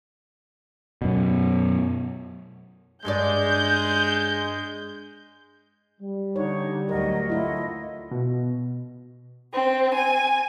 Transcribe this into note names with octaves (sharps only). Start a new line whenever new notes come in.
F#2 B2
G2 G#3 G#4 D5 G6
G3
D3 D#4 C#5
D2 F#3 A#4 D#5
A3 E4 F4 D#5
B2
C4
G#5